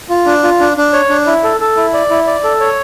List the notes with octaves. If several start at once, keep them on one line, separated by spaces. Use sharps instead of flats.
F4
D4
F4
D4
D4
C#5
D4
E4
A4
A4
E4
D5
E4
D5
A4
C#5